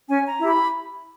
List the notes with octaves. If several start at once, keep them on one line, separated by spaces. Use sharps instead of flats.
C#4 G#5
A#5
E4 G4
B5